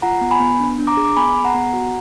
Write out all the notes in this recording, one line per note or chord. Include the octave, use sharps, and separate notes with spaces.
F4 F#5 A#5
B3
G#5 B5
B3
D4
D4
A#5 D6
G#4
D6
B3 G#5 B5
G#4
F#5 A#5
B3
F#4